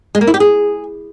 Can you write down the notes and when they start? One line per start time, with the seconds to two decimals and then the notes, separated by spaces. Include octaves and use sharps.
0.15 G#3
0.21 A#3
0.27 E4
0.34 G4
0.40 G#4